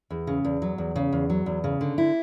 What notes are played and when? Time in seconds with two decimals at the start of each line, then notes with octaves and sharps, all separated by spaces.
0.10 E2
0.27 C#3
0.45 E2
0.62 F#3
0.78 E2
0.96 C#3
1.13 E2
1.30 F#3
1.46 E2
1.64 C#3
1.81 D3
1.98 E4